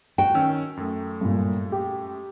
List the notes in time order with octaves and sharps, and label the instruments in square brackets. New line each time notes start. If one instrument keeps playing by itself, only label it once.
[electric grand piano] F#4 [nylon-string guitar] G5
[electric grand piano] D#3 C#4 E6
F#2 A3
[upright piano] G2 A#2
G4